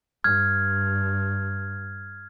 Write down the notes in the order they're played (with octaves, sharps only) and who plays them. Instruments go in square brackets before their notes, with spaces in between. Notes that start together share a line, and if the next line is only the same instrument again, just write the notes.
[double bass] G2 [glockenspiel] F6 G#6